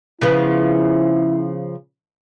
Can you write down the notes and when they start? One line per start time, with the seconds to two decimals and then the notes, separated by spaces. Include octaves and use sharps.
0.21 C#3 F3 B3 E4